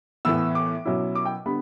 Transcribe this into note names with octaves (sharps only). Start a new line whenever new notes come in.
A2 E3 B3 E6
D6
B2 F#3 C#4 E4
D6
G5
D3 G3 B3 B5